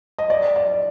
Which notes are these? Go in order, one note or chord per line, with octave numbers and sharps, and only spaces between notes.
D#5
D5
D5